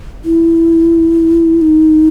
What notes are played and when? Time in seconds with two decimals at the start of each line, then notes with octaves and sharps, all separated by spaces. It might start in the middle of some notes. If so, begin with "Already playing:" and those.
0.25 E4
1.61 D#4